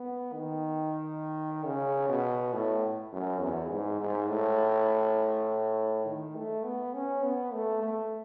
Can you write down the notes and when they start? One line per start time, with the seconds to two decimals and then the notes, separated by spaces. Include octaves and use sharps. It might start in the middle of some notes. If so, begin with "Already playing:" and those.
Already playing: B3
0.33 D#3
1.65 C#3
2.09 B2
2.53 A2
3.12 F#2
3.41 E2
3.70 G#2
4.00 G#2
4.29 A2
6.05 D#3
6.36 A3
6.64 B3
6.94 C#4
7.23 B3
7.53 A3
7.82 A3